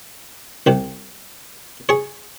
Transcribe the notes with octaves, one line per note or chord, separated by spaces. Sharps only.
C2 C3
G#4 C#5